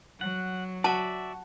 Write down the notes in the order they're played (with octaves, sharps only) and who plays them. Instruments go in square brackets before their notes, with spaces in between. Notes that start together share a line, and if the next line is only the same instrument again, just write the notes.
[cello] F#3 [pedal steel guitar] F#5
[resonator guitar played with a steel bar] F#4 [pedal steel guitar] D5 E5 [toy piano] A5